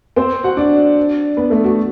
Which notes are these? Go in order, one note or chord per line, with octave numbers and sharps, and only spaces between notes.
C4 C5
F#4 F#5
D4 D5
B3 B4
A3 A4
F#4